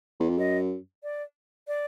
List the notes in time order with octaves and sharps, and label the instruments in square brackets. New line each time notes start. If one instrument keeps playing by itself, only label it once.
[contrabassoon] E2
F2
[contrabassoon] F#2 [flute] D#5
[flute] D5
D5